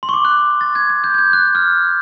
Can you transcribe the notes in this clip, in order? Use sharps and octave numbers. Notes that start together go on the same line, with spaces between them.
C6
C#6
D6
F#6
A6
G#6
G#6
G6
G#6
G6
F#6
F6